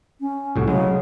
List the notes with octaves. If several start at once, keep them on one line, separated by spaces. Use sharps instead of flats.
C#4
C2 A2 F#4
C#3 F#3 G#3